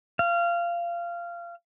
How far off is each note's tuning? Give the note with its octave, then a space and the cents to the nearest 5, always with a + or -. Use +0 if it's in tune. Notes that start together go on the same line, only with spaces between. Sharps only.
F5 -20